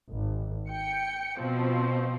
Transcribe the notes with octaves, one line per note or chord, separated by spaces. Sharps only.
G#1
G5 C#7
B2 F3 C4